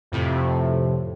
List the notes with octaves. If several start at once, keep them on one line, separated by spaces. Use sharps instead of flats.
F2 A2 C3